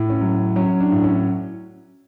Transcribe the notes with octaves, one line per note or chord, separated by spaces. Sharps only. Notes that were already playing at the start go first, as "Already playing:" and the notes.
Already playing: A2
C#4
F#3
F#3 C#4
D4
A2
C#4